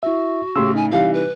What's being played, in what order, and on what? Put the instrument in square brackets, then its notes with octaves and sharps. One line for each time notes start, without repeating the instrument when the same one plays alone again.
[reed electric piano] E4 E5 [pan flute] F#4
[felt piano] A2 C#3 [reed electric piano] G4 C6 E6
[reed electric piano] D#4 [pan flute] G#5
[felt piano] C3 E3 G3 [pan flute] F5
[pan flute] B4